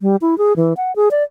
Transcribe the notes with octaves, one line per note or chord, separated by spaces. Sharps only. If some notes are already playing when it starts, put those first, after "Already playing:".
G3
E4
G#4
E3
F#5
G#4
D5